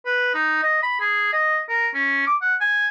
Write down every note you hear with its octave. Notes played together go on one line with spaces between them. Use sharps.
B4
D#4
D#5
B5
G#4
D#5
A#4
C#4
D6
F#5
G#5